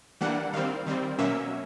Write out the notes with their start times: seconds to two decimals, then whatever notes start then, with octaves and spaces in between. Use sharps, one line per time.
0.21 E3 G3 A#3 D4 F#5
0.53 D#3 G3 C4 F5
0.86 D#3 G3 C4
1.18 B2 F#3 A#3 C#4 E5